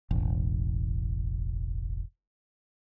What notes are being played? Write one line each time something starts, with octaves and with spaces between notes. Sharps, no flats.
E1 A1